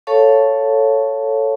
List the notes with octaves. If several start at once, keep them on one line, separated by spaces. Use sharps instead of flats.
A4 C#5 F5 A5 C#6